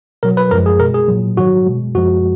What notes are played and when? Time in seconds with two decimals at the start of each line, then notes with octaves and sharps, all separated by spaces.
0.23 B2 F#3 A#4
0.37 B4
0.51 F#2 F3 G#3 A#4
0.66 G#4
0.80 B2 G#3 A#4
0.94 G#4
1.08 A#2 F#3
1.37 G#2 D#3 F#3 F#4
1.67 B2 G#3
1.95 F#2 F3 G#3 F#4